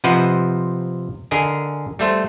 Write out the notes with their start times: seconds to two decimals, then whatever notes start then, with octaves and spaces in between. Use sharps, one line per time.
0.04 C3 F3 B4 C5 D#5 F#5
1.31 D3 G#4 A#4 D#5 G#5
1.99 G3 A3 C5